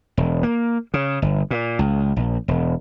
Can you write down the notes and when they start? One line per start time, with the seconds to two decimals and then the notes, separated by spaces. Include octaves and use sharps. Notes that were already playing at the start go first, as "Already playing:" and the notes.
0.17 E1
0.43 A#3
0.94 C#3
1.22 G1
1.50 A#2
1.79 C#2
2.16 A#1
2.48 E1